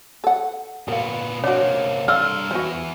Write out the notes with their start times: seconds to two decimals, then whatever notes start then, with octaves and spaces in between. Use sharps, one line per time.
0.24 A4 F#5
0.88 A#2 B3 A#4 F5
1.44 C3 A#3 D4 F#4 C#5
2.08 G2 A4 D5 F5 C6 E6 F6
2.51 E3 B3 F#4 C5